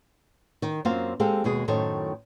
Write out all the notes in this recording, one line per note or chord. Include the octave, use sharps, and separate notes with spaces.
D#3
F#2 A#3 C4 F4 C5 F5
G#3 C4 G4 A4 F5
D#2 B2 G#3 G#4
F#2 A2 D#3 A4 C5 C#5